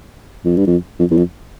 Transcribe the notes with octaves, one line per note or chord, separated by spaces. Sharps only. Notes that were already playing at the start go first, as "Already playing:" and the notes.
F2
G2
F2
F2
E2
F2